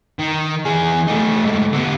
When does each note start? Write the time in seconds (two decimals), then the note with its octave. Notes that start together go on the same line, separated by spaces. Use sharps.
0.19 D#3
0.65 E3 G#4
1.08 A3 D#4
1.45 G#2 A3
1.73 D3 B3